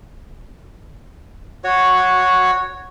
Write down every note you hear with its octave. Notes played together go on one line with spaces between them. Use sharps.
F#4 C#5